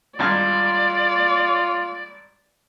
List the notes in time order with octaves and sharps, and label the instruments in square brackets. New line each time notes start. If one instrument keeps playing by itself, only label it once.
[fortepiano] G#1 G2 F6 [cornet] F4 [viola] D5